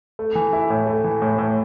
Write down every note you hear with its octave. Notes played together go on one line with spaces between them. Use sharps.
A3
E3
E4
A2
A3
E3
A2
A2